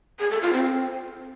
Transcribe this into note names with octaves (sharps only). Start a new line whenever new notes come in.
G#4
A4
F4
C4